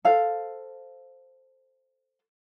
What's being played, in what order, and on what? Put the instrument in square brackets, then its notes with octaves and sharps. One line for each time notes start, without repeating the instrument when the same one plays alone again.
[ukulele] A4 C5 F5